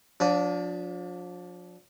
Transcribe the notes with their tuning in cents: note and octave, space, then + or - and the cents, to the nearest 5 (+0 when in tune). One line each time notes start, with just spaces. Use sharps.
F3 +35 D4 -15